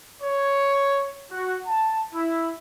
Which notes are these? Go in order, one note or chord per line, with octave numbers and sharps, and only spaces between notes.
C#5
F#4
A5
E4